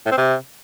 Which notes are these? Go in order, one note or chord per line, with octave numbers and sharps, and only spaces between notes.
A2
C4
C3